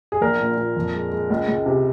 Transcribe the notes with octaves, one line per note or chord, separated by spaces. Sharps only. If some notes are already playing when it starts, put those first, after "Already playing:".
G#4
A#1 A#4
A#2
A#2
F2
G#3
G#3
C#2
C#2
C3